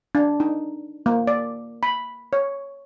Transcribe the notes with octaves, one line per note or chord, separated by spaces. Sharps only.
D4
D#4
A#3
D5
B5
C#5